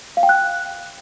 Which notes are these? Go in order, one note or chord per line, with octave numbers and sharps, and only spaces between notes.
F5
G5
F#6